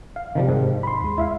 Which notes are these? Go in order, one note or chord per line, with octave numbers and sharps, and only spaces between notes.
F5
C3 D#3 F3 G3
G#2
B5 C6
D#2 G#3
E4 E5 F5